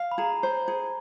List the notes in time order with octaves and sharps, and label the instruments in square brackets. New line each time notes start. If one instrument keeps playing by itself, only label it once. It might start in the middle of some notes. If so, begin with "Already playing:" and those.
Already playing: [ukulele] F5
[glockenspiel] B5
[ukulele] G#4 [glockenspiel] A#5
[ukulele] C5
G#4